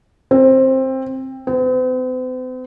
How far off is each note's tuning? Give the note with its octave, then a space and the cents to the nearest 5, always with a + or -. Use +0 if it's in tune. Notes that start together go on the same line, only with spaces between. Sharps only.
C4 +15
C4 -45